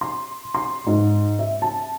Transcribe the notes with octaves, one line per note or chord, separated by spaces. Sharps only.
C6
C6
G#2
E5
A5